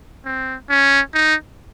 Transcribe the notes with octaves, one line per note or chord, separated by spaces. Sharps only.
C4
C#4
D#4